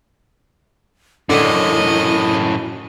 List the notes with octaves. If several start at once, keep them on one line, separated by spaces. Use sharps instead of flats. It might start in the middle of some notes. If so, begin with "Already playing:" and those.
F#2 A2 D3 E4 D#5